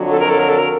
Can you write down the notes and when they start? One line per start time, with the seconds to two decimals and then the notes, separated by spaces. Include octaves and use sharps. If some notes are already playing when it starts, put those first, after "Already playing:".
Already playing: F2 D3 F#3
0.11 A4
0.20 A#4
0.30 A4
0.39 A#4
0.49 A4
0.58 A#4